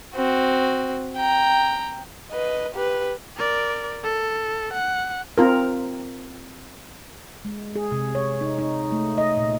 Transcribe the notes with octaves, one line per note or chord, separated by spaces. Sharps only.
C4 F#4
G5 A#5
B4 D#5
G4 B4
A#4 D5
A4
F#5
C4 F4 A#4
G#3
G#4
C3
C#5
D#4
D#4
A3
D#5
A#2